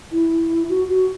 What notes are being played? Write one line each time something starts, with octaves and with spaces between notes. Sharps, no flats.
E4
F#4
F#4